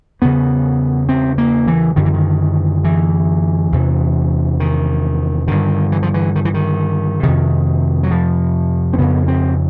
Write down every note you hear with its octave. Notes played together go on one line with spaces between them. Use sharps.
E2 C#3 B3
C4
A#3
E3
F#2 D3 D#3
E3
D#3
E3
E2 C3
D#3
G2 D3 D#3
E3
F3
E3
D#3
E3
D#3
F2 C3 D#3
F#3
F3
C4
F2 C#3 B3
C4